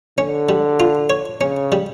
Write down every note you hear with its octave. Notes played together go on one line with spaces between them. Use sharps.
D3 C#4
G3
F4
C#5
C#3 C#4
G3